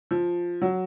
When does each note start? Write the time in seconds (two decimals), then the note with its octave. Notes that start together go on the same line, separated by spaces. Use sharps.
0.11 F3
0.61 F#3